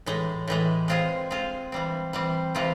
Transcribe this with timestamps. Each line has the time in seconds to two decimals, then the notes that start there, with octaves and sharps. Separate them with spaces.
0.06 A2 E3 G#3
0.48 A2 E3 G#3
0.88 G#3 C4 F4 G#4
1.30 G#3 C4 F4 G#4
1.72 E3 G3 C4
2.13 E3 G3 C4
2.55 C3 E3 G#3 C4 F4